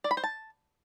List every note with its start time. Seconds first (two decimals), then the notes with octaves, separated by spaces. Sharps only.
0.04 D5
0.11 B5
0.17 C5
0.24 A5